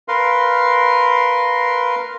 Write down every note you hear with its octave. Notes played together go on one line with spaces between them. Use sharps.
A#4 B4 F5 C6